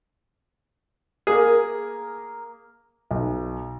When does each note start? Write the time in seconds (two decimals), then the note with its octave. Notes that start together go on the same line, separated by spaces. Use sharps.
1.27 A#3 G#4 A#4
3.11 B1